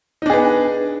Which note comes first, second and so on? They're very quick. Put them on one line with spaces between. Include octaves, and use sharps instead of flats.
D#4 D4 G#4 B3